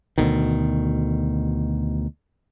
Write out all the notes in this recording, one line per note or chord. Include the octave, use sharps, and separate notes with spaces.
D2 B2 D#3